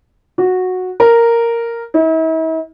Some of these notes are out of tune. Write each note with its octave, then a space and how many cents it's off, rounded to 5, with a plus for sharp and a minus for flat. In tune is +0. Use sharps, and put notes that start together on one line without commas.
F#4 -10
A#4 -5
E4 -45